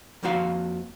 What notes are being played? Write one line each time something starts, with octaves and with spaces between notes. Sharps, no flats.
F2 F3 A#3 F#4 F5